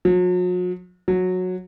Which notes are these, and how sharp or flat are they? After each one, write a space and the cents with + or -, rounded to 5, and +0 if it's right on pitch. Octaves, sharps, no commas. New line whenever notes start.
F#3 -45
F#3 -15